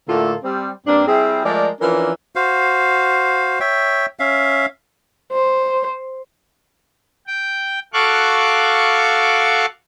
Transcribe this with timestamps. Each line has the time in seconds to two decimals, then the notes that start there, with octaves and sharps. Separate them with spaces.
0.09 A2 D3 A3 A#3 F4 A4
0.44 G3 C4
0.87 G2 A#3 C4 D4
1.08 G3 C4 E4 G#4
1.45 F3 G#3 A3 A#4 D5
1.81 E3 F3 C#4 D4 A#4
2.36 F#4 C5 F5
3.60 C#5 E5 G5
4.19 C#4 E5 F5
5.32 C5
7.27 G5
7.93 F#4 A4 F5 C#6 D6 F#6